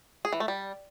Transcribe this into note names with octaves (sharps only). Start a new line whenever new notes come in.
G#4
E3
A3
G3